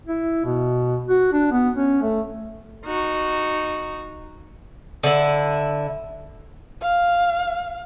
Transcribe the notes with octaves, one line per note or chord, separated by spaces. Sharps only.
E4
B2
F#4
D4
B3
C#4
A3
D#4 F#4
D3 E4
F5